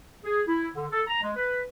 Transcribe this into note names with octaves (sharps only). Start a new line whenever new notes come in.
G#4
E4
D3
A4
A#5
G#3
B4